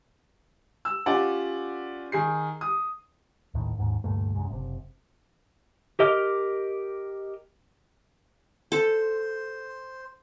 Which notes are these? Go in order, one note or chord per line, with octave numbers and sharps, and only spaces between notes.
E6
C#4 F4 G4 D5 F#5
D#3 G#4 C7
D#6
A#1 D#2 A2 D#3
D#2 G#2
D2 G2 A#2 A3
A#1 F#2 C3 G#3
F#1 A2 C3
G4 A#4 D#5 D6 F6
A4 C5